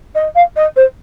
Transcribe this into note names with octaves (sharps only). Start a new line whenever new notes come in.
D#5
F5
D#5
C5